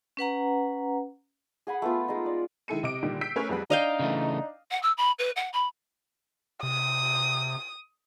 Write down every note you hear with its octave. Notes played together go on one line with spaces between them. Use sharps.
C#4 B4 F#5 A#5
G#4 F#5 G#5 B5
A3 B3 F4
G#3 D#4
D5
D#3 G#3 E4 A4 C#7 D#7
C3 D#5 D6 D7
A#2 D3 D#3 G3
E6 G6 B6 C7 D7
A3 C#4 A#4 B4 C#5 G#5
F2 G3 G#4 B4 F#5 B5
D4 D#4 D#5 F5 G5
C#3 E3 A3
F#5
E6
B5
B4
F#5
B5
C3 D#6